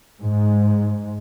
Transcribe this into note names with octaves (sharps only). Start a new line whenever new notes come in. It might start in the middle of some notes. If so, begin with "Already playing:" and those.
G#2